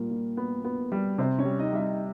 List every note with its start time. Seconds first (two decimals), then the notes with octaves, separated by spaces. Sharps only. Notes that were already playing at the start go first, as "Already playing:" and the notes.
Already playing: A#2 G3 A#3
0.11 A#2
0.37 B3
0.65 B3
0.92 G3
1.18 C3 C4 C5
1.38 C#4 C#5
1.45 G3
1.59 D#4 D#5
1.73 G3 E5
1.79 D#4 D#5